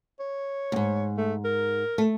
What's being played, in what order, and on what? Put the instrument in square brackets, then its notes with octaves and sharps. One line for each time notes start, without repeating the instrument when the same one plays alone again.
[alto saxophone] C#5
[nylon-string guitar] D#2 G#2
[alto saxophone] A3
A#4
[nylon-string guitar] A3